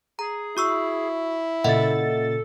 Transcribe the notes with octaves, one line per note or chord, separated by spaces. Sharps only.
G#4 A#5
E4 F#4 C#6 E6
A#2 C#3 A4 D#5 E5 F#5 A6